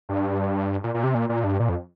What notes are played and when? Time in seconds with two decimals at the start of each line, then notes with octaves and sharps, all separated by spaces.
0.09 G2
0.84 A#2
0.94 A#2
1.04 C3
1.15 A#2
1.29 A#2
1.44 G2
1.60 A#2
1.69 F2